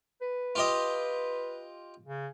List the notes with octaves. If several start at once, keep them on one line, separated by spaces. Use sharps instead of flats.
B4
F4 G4 D#5
C#3